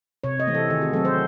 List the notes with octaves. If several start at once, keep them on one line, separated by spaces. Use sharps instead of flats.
C3 C#5
D#5
E3 A3 C4
A4
D#3 G#4
F#4
F#3 A3 C4 A4
C5